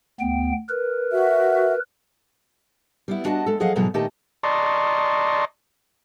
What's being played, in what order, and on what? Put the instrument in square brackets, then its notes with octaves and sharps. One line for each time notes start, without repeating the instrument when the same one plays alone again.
[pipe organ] D2 B3 G5
A#4 B4
[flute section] F#4 E5
[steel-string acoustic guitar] G3 B3 E4
D4 F#4 D#5 F#5 A5
G#3 A4
F3 F#3 G#4 D#5 F5 F#5
G#2 B2 E3 F#3 G#3 A#5
A#2 D#3 A3 G4 D#5 A5
[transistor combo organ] D5 D#5 A5 A#5 C6 C#6